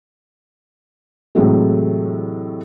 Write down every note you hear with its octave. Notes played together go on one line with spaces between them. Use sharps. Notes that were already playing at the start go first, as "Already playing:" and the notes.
A2 C3 E3 F#3 G#3 A3